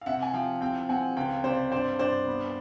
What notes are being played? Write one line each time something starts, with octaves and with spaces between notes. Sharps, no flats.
F5
C3 E5 F#5
G#5
F3 F5 G5
C4 F5 G5
C4 F#5 G#5
C#2 F5 G5
C3 C5 D5
G2 C5 D5
G2 C5 D5
B3